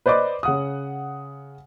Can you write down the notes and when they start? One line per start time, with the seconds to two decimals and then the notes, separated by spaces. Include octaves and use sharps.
0.06 B4 C5 D5 D#5 D6
0.43 C#3 F#5 D#6